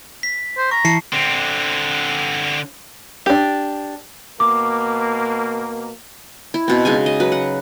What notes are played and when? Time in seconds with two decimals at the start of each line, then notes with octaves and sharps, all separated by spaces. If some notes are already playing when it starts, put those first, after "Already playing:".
0.23 B6
0.58 C5
0.71 A#5 C#6
0.85 E3 A5 C7 C#7
1.13 D3 C4
3.26 D4 G4
4.40 B2 A#3 D6
6.54 E4
6.68 B2 C4
6.85 C#3 G#3 D#4 G#5
7.06 D#5
7.20 F#3 B4
7.32 F#5